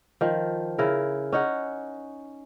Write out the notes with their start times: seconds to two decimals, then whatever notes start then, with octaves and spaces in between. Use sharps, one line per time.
0.21 D#3 F3
0.78 C#3 E4 A#4
1.32 C#4 D#4 F#5